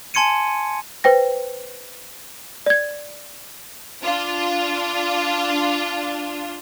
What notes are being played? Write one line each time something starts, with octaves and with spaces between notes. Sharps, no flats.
G#5 A5 C6 G#6 C#7 D#7
B4 C5 G5 A#6
D5 G#6
D4 F4